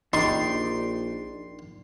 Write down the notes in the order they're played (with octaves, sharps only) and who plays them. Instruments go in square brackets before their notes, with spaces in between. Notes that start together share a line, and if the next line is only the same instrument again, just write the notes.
[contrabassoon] A#1 [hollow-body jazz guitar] D4 G4 [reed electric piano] D#4 [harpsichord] C6